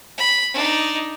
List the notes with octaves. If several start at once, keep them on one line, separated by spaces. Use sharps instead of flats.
B5
D4 D#4